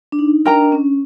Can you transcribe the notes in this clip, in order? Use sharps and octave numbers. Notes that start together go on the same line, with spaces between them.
D4
D#4
D4 A#4 D#5 G5 A#5
D4
C#4